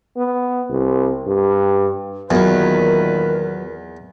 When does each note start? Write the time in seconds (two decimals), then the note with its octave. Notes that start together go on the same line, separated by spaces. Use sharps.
0.17 B3
0.70 C2
1.27 G2
2.31 E2 A#2 D#3 F#3 B3 A#4 B4